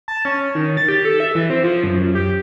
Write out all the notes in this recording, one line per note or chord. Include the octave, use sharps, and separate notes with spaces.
A5
C#4
D#3
A6
G4
A4
E5
E3
C4
F3
F#2
G4